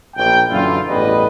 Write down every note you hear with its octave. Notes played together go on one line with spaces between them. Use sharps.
A#1 G5
F#2 A#2 D3 E3 E4 F4
A1 E2 G2 G3 B4 D#5